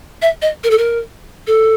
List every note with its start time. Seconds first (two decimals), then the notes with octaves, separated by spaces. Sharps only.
0.22 E5
0.42 D#5
0.64 A#4
0.70 A4
0.78 A#4
1.47 A4